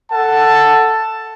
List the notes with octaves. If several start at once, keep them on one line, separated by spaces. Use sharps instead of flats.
A4 F#5 A5